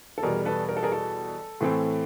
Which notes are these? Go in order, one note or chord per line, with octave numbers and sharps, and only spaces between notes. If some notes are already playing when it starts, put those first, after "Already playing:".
A4
E2 B2 G3 G#4 A#4
A4 B4
A#4
A4
G#4 A#4
A4
A2 E3 A3 C4